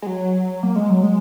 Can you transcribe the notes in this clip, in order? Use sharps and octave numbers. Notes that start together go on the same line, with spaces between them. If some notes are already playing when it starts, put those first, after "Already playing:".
G#3
F#3
A#3
G#3
F#3
G#3